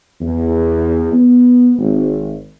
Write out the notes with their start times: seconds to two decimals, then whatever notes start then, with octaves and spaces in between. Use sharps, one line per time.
0.22 E2
1.13 B3
1.78 G#1